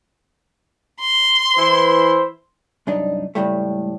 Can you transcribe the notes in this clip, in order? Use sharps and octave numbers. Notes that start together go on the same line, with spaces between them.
C6
E3 E4 C5
C2 F#2 D4 D#4
C#2 A2 G3 A3